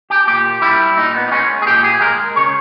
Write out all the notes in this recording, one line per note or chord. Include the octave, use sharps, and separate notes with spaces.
G4
A#2 G4
G3 E4
A#2 D#4
B3
D#4
G#3 C#4
G#4
A#2 G4
G#4
G#3 A#4
C#3 C#5